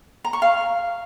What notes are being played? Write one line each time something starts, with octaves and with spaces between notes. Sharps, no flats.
A#5
C#6
F5